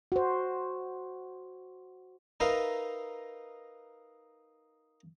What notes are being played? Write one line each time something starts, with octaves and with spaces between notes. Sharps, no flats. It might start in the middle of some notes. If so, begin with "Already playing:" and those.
F#4 C5
D#4 A#4 B4 E5 F5